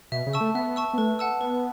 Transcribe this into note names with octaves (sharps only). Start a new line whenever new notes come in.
B2 E5
C#3
A5 C#6 E6
A3
B3 E5
A5 C#6 E6
B3
A3 B4
F#5 A5 E6
B3 B4